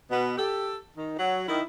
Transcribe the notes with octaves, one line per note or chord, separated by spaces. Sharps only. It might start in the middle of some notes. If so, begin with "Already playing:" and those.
B2 B3
G4 A4
D#3
F#3
D#3 E4